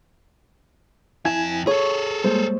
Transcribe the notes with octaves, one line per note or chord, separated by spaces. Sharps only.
F2 E4 G#5 A5 G#6
G#4 A4 C#5 C#6
G3 G#3 A#3 C5